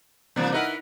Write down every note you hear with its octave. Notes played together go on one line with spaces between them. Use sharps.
C3 E3 G3 A#3 D4
D#4 E4 A#4 B4 F#5